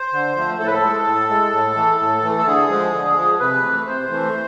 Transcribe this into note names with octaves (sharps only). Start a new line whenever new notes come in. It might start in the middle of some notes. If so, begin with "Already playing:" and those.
Already playing: C5
D3
F3 A3
A2 A4
B4
A4
G#3
A2
G#3
A2
E3 A3
A2
E3 A3
A4
D3 G#4
F3 G#3
D3
F3 G#3
C3 B4
E3 A3
C3 C5
E3 A3